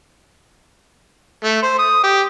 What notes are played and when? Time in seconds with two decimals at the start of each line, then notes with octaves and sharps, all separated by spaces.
1.44 A3
1.62 C5
1.79 D#6
2.03 G4